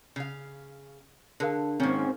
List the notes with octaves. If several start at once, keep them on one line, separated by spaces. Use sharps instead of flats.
C#3 F5
D3 G#4 A#4 F5
G#2 D#3 A#3 C4 C#4